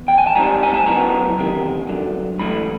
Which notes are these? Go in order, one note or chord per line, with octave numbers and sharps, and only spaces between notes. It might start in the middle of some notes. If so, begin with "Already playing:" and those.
Already playing: E2
G5
G#5
A5
G#2 E3 G3 C4 D#4 A#5
G#5
A5
C#3 F#3 B3 E4 A#5
E2 C3 D#3
G2 D3 F#3
G#2 E3 A3 B5